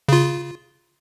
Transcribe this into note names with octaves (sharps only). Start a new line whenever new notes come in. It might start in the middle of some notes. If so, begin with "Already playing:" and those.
C#3 F4